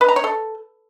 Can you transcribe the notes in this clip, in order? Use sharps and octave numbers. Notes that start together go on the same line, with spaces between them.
B4
A#5
C#5
A4